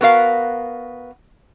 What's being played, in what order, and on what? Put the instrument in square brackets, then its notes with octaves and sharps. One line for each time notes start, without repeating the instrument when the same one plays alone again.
[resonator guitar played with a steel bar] B3 F#4 A#4 F5